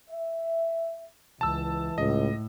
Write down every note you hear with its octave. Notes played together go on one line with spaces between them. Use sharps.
E5
C#2 E3 A5 E6
C#2 A2 D#5